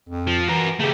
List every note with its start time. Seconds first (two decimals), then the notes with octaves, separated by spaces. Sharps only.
0.09 F2
0.27 F3
0.48 E3 F#4 A#4
0.80 C#3 A3 G4